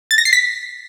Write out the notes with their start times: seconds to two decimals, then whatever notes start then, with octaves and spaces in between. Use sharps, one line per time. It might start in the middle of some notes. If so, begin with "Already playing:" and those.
0.11 A6
0.18 A#6
0.25 C7
0.33 B6